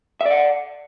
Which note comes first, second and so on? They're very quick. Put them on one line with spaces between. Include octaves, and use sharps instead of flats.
E5 D5 F#5